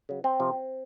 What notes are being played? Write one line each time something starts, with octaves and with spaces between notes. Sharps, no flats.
C#3 F#3
C4
C3 F3